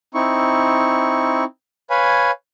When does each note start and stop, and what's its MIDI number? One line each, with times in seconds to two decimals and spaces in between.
0.14 1.44 60
0.14 1.44 63
0.14 1.44 64
0.14 1.44 85
1.90 2.31 71
1.90 2.31 73
1.90 2.31 77
1.90 2.31 80
1.90 2.31 83